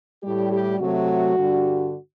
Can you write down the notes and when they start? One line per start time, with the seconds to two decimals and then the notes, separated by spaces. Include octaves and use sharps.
0.23 A2 G3 G4
0.51 G4
0.79 C3 F#3 A3 F#4
1.36 G2 D3 G3